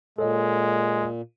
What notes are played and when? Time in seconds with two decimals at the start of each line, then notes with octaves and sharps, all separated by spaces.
0.18 A#2 G#3 A4 C#5 D#5